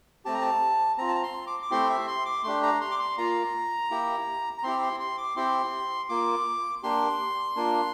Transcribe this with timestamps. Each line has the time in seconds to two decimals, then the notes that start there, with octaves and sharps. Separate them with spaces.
0.25 A3 C4 G4 A5
0.34 A#5
0.41 A5
0.98 C4 F4 A#5
1.08 A5
1.15 A#5
1.23 C6
1.47 D6
1.62 D6
1.71 A3 C4 E4 G4 C6
1.90 E5
2.07 C6
2.25 D6
2.44 A3 D4 G4 C6
2.63 A#5
2.81 C6
2.91 D6
2.99 C6
3.18 A#3 F4 A#5
3.91 A#3 E4 G4
4.58 A#5
4.63 C4 E4 G4 C6
4.82 C6
5.00 C6
5.18 D6
5.36 C4 E4 G4 C6
6.09 A#3 F4 D6
6.83 A#3 D4 G4 C6
7.56 A#3 D4 F4